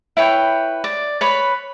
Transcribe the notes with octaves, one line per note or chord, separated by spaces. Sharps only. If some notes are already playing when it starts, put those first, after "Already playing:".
E4 B4 C#5 G5
D5
B4 C#5 B5